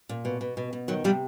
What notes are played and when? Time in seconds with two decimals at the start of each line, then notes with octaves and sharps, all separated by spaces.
0.09 A#2
0.25 B2
0.41 B2
0.57 B2
0.73 B2
0.88 D#3 F#3
1.04 C3 F3 G3